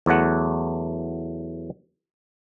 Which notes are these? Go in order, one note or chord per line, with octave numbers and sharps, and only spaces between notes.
E2 F#3 A3 F#5